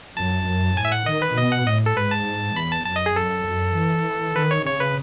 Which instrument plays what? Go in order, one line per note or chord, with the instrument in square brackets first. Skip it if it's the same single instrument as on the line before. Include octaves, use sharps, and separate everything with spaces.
[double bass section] F#2 [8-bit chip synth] A5
[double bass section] F#2
[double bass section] A2 [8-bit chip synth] G#5
[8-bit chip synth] E5
F#5
[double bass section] D#3 [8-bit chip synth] D#5
[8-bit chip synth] B4
[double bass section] B2 [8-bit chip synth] D#5
[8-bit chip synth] F#5
[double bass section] A2 [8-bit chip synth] D#5
[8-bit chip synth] A4
[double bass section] G#2 [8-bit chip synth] B4
[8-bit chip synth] A5
[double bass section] E2 [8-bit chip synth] B5
[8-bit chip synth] A5
[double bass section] F#2 [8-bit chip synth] A5
[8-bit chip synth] D#5
G#4
[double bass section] F#2 [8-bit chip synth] A4
[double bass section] F#2
E3
[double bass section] D#3 [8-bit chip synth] B4
[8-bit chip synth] C#5
[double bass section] C#3 [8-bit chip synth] C#5
[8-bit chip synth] B4